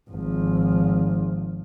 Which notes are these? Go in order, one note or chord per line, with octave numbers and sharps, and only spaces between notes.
G#1 F3